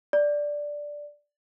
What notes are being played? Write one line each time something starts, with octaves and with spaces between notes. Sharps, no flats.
D5